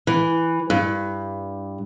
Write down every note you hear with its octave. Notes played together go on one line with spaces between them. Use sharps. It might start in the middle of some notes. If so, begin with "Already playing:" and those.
E3
G2